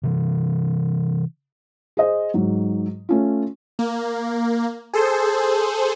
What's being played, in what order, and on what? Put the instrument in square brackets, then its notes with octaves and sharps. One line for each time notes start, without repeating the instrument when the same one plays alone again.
[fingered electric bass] C3 E3
[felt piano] G#4 C5 D#5
G#2 F#3
A3 C#4 F4
[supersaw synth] A#3
G#4 A4 C5